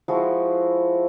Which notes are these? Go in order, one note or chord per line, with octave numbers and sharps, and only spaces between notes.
F3 G#3 E4 F#4